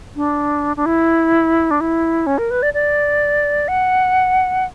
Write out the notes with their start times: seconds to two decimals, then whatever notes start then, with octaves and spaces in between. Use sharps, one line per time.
0.16 D4
0.77 D4
0.86 E4
1.71 D4
1.81 E4
2.27 C#4
2.38 A#4
2.51 B4
2.62 D5
2.74 D5
3.68 F#5